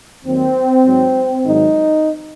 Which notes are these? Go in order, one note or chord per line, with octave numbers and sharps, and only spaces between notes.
D#2 D#3 F#3 C4
G#2 F#3
G#2 D#3 F#3 D#4